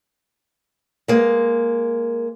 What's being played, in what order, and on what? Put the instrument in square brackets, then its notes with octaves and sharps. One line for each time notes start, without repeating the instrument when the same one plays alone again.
[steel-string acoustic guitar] G#3 A#3